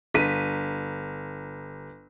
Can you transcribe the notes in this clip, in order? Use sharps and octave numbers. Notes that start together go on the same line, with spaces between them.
G1 B6 D#7